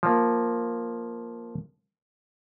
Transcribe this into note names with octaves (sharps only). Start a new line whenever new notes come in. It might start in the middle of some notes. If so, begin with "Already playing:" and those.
F3 A#3